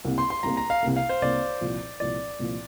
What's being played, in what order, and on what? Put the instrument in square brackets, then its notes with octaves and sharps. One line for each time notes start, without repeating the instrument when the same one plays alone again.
[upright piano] C2 C3 A#3
[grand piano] C6
C6
[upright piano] C2 C3 A#3 [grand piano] A#5
[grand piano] A#5
F5
[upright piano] C2 C3 A#3
[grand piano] F5
C5
[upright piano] C2 C3 A#3 [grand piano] D5
[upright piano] C2 A#2 F3
[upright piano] C2 A#2 F3 [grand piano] D5
[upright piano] C2 A#2 F3